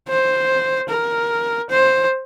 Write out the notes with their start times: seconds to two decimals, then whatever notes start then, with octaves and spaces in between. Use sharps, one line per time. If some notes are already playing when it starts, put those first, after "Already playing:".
0.08 C5
0.89 A#4
1.70 C5